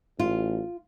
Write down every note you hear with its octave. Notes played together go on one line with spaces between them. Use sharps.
A1 F4